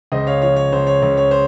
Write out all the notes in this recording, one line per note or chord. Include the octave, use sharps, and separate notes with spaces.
C#2 C5 D#5
C#5 F5
F3 C#5
C#5
C#2 C5
C#5
C#2
C#5
C5